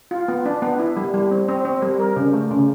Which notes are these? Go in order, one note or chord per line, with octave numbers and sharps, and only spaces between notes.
F4
B3
D4
B3
E4
G3
G3
C4
C4
C4
G3
A#4
C#3
A3
C#3